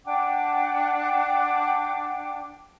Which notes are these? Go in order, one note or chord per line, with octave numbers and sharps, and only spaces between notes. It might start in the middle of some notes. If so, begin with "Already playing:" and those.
D4 F#5 G5 D6